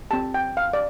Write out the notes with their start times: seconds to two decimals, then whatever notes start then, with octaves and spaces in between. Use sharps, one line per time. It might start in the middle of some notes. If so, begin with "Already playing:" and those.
0.11 C4 G4 A5
0.34 G5
0.57 F5
0.73 D5